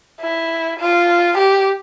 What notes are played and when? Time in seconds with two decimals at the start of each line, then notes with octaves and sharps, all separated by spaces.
0.21 E4
0.79 F4
1.38 G4